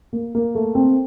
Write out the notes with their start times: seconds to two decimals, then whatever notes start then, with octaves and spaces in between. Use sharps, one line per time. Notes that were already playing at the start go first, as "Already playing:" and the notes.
0.13 A#3
0.35 A#3
0.55 A3
0.75 C4